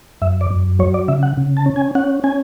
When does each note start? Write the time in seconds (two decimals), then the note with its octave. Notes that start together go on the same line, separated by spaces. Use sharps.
0.22 F#2 E5
0.41 D5
0.51 F#2
0.79 F#3 C#5
0.94 D5
1.08 C#3 E5
1.23 F#5
1.37 C#3
1.57 A5
1.66 C#4
1.76 G#5
1.95 C#4 F#5
2.24 C#4 G#5